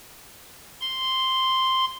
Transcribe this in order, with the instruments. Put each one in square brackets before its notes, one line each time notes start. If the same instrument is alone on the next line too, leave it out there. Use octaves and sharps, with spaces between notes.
[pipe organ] C6